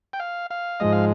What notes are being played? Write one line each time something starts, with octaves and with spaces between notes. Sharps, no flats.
G5
F5
F5
G#2 F3 G#3 D#5
F5